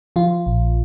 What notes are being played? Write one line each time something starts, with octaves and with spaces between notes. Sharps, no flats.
F3 F4
A#1